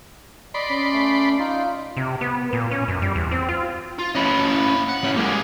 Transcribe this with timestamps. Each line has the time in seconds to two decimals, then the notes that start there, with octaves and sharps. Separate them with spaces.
0.54 D5 D#5 B5 C6
0.69 C#4
0.92 A3
1.39 D#4 F4
1.97 C3
2.21 B3
2.53 A#2
2.71 C#4
2.88 F#2
3.02 G3
3.15 E2
3.31 C4
3.49 F4
3.99 F4
4.15 C#4 E4 D#5 B5
4.46 A#3 B5
4.89 F#5
5.04 C#4 E4
5.17 G#3 A#3 G4 G#4